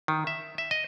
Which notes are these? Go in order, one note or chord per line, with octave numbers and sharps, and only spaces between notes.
D#3
E5
E5
D#5